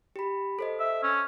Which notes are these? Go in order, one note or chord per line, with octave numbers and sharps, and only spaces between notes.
G4 B5
A4 C5 D#5
E5
C#4